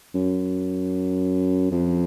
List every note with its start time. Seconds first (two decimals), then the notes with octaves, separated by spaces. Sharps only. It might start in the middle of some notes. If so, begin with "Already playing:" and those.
0.15 F#2
1.71 F2